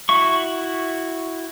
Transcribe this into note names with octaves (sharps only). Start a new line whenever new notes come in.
E4 F#4 E5 C#6